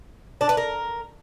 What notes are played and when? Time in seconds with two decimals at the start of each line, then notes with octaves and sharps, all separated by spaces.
0.41 D4
0.49 B4
0.57 A#4